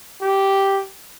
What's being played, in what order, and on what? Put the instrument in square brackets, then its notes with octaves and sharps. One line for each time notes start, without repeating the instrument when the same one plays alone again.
[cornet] G4